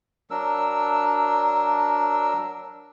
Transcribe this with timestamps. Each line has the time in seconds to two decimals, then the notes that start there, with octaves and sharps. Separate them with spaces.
0.31 F#3 D4 A#4 E6